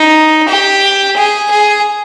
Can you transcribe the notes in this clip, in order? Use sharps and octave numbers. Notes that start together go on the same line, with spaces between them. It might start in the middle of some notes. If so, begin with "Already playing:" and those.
Already playing: D#4
G4
G#4
G#4